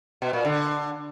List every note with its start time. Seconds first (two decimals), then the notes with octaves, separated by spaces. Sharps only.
0.22 B2
0.33 A#2
0.45 D3